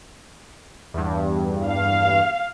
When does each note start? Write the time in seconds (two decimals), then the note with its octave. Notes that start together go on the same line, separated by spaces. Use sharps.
0.94 E2 G2
1.68 F5